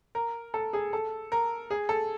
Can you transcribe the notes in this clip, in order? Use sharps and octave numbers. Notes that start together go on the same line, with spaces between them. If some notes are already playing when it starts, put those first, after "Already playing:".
A#4
A4
G#4
A4
A#4
G#4
A4